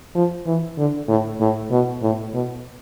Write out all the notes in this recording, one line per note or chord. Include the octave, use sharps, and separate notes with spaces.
F3
E3
D3
A2
A2
B2
A2
B2